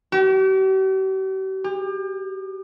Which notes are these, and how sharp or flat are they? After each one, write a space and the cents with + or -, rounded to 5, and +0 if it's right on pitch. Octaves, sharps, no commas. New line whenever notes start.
G4 -45
G4 +35